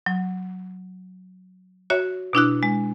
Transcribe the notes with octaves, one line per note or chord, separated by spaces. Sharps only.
F#3
F#4 C#5 E5
B2 D4 E4 F#6
G#3